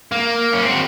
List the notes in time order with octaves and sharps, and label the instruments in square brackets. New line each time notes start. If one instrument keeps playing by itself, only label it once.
[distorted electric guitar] A#3
C#4
C4
F#4